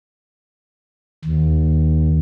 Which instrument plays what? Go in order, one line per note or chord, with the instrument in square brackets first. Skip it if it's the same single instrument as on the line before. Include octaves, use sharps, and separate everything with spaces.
[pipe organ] D#2